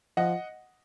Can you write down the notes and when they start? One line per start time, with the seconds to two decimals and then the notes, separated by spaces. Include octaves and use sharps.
0.17 F3 D#5 F#5